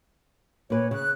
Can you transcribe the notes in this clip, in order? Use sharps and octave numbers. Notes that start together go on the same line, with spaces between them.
A#2 B4 C#5
C#3 F#6